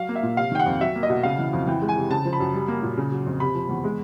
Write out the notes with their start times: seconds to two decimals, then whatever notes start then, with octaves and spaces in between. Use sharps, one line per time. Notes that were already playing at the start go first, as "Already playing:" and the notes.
Already playing: F#3 F5
0.09 A#3
0.16 E5
0.23 A#2
0.37 C3 F5
0.52 D#3 G5
0.59 F#5
0.66 F2
0.81 F#3 E5
0.96 A#3
1.03 D#5
1.10 B2
1.23 C#3 F5
1.39 E3
1.53 F2
1.67 E3 G5
1.82 G#3
1.89 G#5
1.96 C3
2.10 C#3 A5
2.25 F3
2.33 B5
2.40 F#2
2.54 G3
2.68 A#3
2.83 A#2
2.98 C#3
3.12 F#3
3.26 F2
3.40 C3 B5
3.55 F3
3.69 E2
3.84 G#3